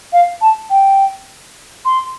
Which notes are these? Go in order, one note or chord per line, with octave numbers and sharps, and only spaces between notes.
F5
A5
G5
C6